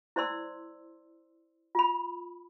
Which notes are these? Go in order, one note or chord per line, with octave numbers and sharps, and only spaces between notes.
E4 C5 D5 C6 E6
F4 B5